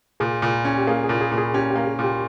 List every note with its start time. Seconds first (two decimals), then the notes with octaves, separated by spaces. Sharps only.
0.20 A#2 G#4
0.42 A#2
0.65 C#4
0.78 G4
0.87 A#3 G#4
1.04 G#4
1.09 A#2
1.21 G#4
1.32 A#2
1.38 G#4
1.54 C#4 G4
1.70 G4
1.76 A#3
1.87 G#4
1.99 A#2
2.04 G4